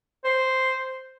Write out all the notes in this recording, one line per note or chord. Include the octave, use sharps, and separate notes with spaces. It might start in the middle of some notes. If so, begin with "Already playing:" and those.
C5